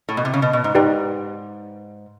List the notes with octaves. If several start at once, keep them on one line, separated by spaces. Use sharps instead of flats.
A2
B2
C3
C#3
B2
B2
G#2
G#2 D#4 G4 B4 D5 G5